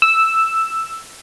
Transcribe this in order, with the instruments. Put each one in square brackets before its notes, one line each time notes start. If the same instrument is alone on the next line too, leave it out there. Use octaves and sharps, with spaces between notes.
[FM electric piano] E6